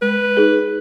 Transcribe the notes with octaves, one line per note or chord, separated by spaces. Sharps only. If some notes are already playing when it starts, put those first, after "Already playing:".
G#3 B4
D#4 G#4